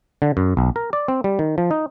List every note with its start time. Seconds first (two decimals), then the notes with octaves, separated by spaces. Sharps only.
0.22 D3
0.37 F#2
0.57 B1
0.76 A#4
0.93 D5
1.08 C4
1.24 G3
1.39 D#3
1.58 F3
1.71 D#4